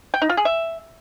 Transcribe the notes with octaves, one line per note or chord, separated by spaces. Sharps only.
G5
D#4
F4
G#4
E5